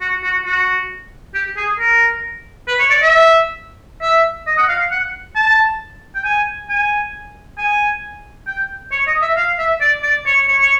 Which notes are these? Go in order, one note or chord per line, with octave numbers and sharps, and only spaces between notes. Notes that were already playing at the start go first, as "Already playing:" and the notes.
F#4
F#4
F#4
G4
G#4
A#4
B4
C#5
D5
E5
E5
D#5
F#5
F5
F#5
A5
G5
G#5
G#5
G#5
G5
C#5
D#5
E5
F5
E5
D5
D5
C#5
C#5
C#5